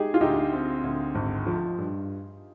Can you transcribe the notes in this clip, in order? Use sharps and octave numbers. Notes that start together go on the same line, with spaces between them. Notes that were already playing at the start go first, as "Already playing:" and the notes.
Already playing: G#3 D#4 G4 G#4
F4
D2 D#4 G4
C4
D2
G#1
F3
G2